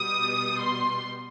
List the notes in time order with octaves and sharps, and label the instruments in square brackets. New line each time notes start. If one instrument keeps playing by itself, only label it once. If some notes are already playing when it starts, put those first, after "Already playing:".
Already playing: [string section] B2 G3 B3 D#6
C6